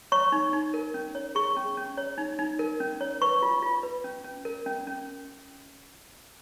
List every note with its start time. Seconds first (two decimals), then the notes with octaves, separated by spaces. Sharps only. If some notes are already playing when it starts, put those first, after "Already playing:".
0.12 C#5 C#6
0.32 D#4
0.53 D#4
0.74 A#4
0.94 C#4
1.15 C#5
1.35 G#4 C#6
1.56 C#4
1.78 C#4
1.97 C#5
2.18 D#4
2.39 D#4
2.59 A#4
2.80 C#4
3.01 C#5
3.21 B4 C#6
3.42 F4
3.62 F4
3.83 B4
4.04 C#4
4.24 C#4
4.45 A#4
4.66 C#4
4.87 C#4